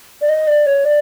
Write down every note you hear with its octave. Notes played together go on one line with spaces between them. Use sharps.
D5
D#5
D5
C#5
D5